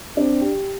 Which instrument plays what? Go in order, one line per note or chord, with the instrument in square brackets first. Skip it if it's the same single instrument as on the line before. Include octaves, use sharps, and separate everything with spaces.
[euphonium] C4 [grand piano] D4
[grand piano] G4